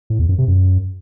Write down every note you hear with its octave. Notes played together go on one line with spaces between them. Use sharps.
A2
E2
F#2
C3
F#2